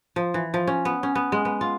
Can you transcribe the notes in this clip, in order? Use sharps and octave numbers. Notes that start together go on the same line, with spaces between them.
F3
E3
F3
C#4
B3
C#4
B3
G#3
B3
F4